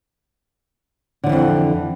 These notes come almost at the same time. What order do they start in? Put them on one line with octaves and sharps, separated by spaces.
D3 F3 E3 F2